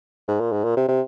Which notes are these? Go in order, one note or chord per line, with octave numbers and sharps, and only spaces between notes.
G#2
A#2
G#2
A#2
C3
C3